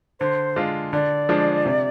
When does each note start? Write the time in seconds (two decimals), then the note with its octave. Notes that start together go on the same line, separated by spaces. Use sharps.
0.20 D3 C5
0.56 G#3 D4 F4
0.93 D3 D5
1.29 F3 G#3 D4
1.65 C3